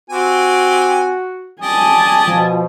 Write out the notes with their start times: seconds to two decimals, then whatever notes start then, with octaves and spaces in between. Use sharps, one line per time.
0.10 C4 F#4 G4 G#5
1.62 G4 D5 D#5 G#5 A5
2.28 B2 F3